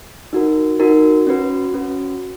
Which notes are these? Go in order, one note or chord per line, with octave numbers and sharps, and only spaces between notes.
D#4 F#4 A#4
D#4 F#4 A#4
C#4 F#4 B4
C#4 F#4 B4